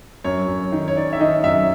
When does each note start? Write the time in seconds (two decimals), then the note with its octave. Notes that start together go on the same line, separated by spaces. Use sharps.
0.24 F#2 C#5
0.48 F#2
0.72 D#3
0.88 C#5
0.96 D#3 D5
1.13 E5
1.20 D#3 D#5
1.44 F#2 E5